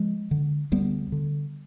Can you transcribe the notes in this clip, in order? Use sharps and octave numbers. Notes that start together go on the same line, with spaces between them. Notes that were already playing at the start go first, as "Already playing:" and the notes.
Already playing: F3 G#3
D3
D2 G3 B3
D3